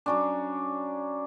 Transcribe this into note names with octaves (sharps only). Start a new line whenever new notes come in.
F#3 C#4 D4